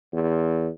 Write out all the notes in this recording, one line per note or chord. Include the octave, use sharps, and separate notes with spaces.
E2